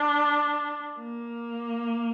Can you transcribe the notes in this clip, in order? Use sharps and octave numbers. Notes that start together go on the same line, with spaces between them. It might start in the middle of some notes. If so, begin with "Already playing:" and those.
Already playing: D4
A#3